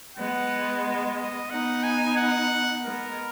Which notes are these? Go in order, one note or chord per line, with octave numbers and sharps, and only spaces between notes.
G#3 B3 F#5
D#5
B3 D#4 F#5
G#5
F#5
G#3 B3 A#4